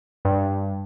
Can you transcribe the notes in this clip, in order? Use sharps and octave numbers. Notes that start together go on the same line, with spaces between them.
G2